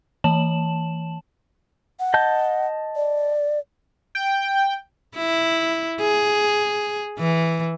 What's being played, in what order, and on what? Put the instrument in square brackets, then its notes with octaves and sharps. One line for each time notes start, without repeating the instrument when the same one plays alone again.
[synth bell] E3 A5 E7 F#7
[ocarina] F#5
[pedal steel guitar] D#5 A5 G6
[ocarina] D5
[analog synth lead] G5
[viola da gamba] E4
G#4
E3